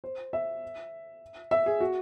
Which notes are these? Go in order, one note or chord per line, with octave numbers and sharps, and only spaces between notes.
C5
E5
E5
G#4
F#4